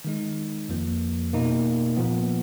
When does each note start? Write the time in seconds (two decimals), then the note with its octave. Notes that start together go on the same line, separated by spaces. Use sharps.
0.05 D#3 G#3 D#4
0.69 F2 F3 A#3
1.33 B2 A#3 D#4
1.97 A#2 F3 B3